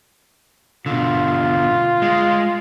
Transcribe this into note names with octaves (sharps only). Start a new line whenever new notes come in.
B2 D3 F4
G#3